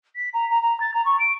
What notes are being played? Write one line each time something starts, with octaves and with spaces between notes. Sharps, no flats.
B6
A#5
A#5
A#5
A6
A#5
C#6
D7